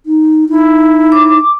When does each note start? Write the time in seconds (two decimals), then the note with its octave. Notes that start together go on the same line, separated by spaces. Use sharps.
0.06 D#4
0.49 D#4 E4
1.12 D6